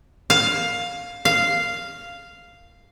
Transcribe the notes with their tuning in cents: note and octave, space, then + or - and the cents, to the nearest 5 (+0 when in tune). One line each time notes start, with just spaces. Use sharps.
F5 +10
F5 -5